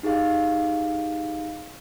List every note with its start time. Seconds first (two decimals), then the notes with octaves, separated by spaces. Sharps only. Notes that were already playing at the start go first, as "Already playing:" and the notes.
0.03 D#4 G4 G#4 F5